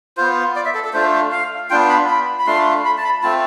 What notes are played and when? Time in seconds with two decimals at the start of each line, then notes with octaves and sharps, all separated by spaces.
0.17 B3 F4 C5
0.56 D5
0.65 E5
0.75 A4
0.85 A4
0.93 A3 D4 F4 C5
1.32 F5
1.70 B3 D4 F4 G5
1.90 B5
2.08 B5
2.39 B5
2.47 A3 D4 F4 C6
2.85 B5
2.98 A5
3.04 B5
3.23 A3 C4 F4 A5